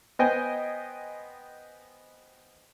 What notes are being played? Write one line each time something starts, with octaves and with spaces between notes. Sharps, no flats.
B3 C5 D#5 G5 G#5